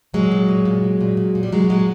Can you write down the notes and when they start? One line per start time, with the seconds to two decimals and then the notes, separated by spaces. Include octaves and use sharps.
0.14 A#2 F#3 G#3
0.31 A#2
0.49 A#2
0.65 A#2
0.84 A#2
1.01 A#2
1.17 A#2
1.35 A#2
1.43 G3
1.52 A#2 F#3 G#3
1.69 A#2 F#3 G#3